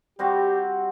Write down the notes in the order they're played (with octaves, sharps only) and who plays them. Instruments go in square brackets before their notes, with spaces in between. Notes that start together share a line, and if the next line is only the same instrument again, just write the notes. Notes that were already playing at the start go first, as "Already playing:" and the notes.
[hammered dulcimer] G3 C4 F#4 [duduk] G4